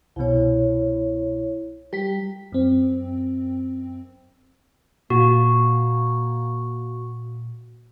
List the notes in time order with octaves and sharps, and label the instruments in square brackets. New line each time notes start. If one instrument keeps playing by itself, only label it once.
[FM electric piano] C2 B2 [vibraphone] E4 C#5
[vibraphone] G3 [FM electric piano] G4 B6
[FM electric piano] F#2 C4
[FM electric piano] A#2 [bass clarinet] A#3 [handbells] F#4